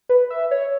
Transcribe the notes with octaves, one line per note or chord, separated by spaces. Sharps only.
B4
E5
C#5